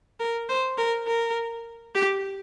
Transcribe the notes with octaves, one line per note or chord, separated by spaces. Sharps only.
A#4
C5
A#4
A#4
G4